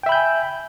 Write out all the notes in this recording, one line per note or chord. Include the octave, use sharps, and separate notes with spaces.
E5 G5 G#5 B5 G6